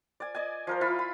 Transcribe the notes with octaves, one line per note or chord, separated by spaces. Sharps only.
D5 G#5
D5 D#5 G#5
F3 A#4 C5
E4 F4 F5 B5
B5